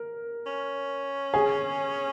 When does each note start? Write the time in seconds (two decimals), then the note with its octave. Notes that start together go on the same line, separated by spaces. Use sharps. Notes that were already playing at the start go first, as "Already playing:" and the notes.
Already playing: A#4
0.46 C#4
1.34 G#4